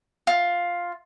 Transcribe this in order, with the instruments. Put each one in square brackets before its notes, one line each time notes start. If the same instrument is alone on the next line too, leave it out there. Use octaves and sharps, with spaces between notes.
[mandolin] F4